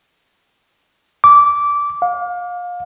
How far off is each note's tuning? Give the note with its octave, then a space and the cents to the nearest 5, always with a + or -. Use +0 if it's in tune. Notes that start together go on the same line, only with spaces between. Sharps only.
D6 -15
F5 +30